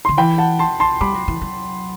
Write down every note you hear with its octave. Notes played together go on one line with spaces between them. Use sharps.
D3 C6
E3 G5 B5
F#5 A5
A5 C6
A5 C6
G3 B5 D6
F#3
E3
F#3